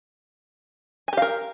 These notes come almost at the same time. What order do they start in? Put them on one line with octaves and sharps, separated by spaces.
G#5 G4 F5 A#4